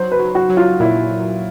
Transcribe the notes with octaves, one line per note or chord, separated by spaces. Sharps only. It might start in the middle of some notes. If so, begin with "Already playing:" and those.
Already playing: F#3 C5
B4
F#3
F#4
F#3
F4
A#2 E4
A#2